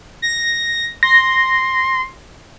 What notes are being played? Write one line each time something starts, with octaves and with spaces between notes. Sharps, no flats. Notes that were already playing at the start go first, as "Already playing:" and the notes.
A#6
C6 A#6